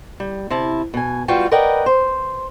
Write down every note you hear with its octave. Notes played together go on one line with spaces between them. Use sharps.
G3
C3 E4 A5
B2 G#5
G3 F4 F#4 B4 G5
A#4 B4 D5 D#5 F#5 G5
C5